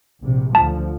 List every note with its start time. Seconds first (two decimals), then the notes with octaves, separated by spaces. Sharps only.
0.21 A#1 C3
0.55 D2 D3 F3 A5